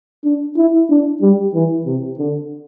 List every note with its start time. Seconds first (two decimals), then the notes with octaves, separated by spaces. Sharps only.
0.24 D4
0.57 E4
0.90 D4
1.22 G3
1.54 E3
1.86 C3
2.19 D3